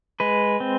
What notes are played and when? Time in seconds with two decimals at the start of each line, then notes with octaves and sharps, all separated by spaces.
0.20 G#3 B4
0.60 C4